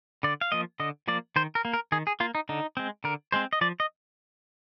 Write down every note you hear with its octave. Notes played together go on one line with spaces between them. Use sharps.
D3 D5
F5
F3 A#3 D#5
D3 D#5
F3 A#3 D5
D#3 C5
A#4
A#3
A#4
D#3 G#4
G#4
A#3 F4
D#4
D3 D#4
G#3 C4
D3 A#4
G#3 C4 C5
D#5
F3 D5
D#5